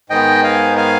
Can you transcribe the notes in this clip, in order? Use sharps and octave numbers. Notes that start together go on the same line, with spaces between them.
G#2 D#3 B3 D#5 G5
F5 G#5
F5 G#5